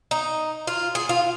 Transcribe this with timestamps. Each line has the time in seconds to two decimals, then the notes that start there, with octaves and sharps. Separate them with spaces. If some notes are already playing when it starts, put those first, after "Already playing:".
0.11 D#4
0.67 F4
0.95 G#4
1.09 F4